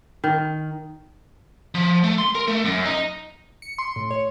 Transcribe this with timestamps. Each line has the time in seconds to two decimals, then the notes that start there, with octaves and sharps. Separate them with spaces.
0.24 D#3
1.75 F3
2.04 A3
2.18 C6
2.35 A#4
2.48 A3
2.65 F#2
2.85 D#4
3.62 C#7
3.78 C6
3.96 A2
4.11 C#5